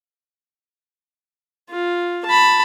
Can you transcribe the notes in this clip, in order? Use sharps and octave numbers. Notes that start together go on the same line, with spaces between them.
F4
A5 B5